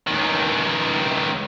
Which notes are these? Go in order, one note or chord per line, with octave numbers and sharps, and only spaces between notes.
C#2 D#3